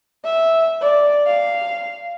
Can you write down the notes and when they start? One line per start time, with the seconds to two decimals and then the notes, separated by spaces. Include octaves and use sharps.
0.25 E5
0.81 D5
1.27 F5